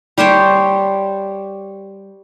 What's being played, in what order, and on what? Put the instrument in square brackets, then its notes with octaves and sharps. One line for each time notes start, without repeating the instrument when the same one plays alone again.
[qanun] G3 G4 C5 C#5